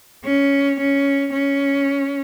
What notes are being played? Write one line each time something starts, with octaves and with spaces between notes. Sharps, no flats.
C#4
C#4
C#4